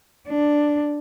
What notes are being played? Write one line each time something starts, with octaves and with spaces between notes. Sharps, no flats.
D4